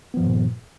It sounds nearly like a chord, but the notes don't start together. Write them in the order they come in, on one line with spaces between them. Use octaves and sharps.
B3 F3 G2 D#3 A#2